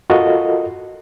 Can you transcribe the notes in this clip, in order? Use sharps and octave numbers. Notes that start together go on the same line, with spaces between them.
F4 F#4 A4 A#4 D#5